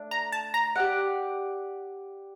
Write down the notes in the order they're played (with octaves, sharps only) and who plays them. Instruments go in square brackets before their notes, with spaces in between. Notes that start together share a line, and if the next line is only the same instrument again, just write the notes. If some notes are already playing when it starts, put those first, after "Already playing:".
Already playing: [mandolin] A3 D4
[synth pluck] A#5
A5
A#5
[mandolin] G4 D5 F#5